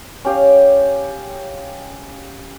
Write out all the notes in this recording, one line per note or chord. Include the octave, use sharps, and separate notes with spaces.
C#4 G4 F5